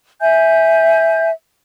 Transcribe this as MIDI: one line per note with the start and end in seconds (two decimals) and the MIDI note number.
0.21 1.29 76
0.21 1.29 80
0.21 1.29 91